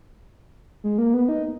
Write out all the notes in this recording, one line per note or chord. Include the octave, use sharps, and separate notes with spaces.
G#3
A#3
B3
D#4